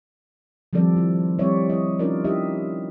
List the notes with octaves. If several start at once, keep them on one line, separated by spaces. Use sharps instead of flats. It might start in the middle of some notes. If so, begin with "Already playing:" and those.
D#3 F3 G3 C4 A4 D5
D#3 E4
G3 C4 E4 C#5 D5 E5
E4 D#5
C#4 D#4 F4 A#4 D5
D#4 E4 G4 D#5 E5